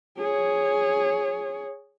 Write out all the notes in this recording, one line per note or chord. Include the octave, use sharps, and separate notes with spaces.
G#4 C#5